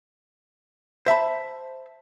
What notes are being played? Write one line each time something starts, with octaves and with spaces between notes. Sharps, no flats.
C5 E5 A5 B5